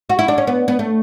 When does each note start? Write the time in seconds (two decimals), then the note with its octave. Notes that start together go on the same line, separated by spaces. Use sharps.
0.09 F#4
0.19 E4
0.28 D4
0.38 C#4
0.47 B3
0.68 B3
0.79 A3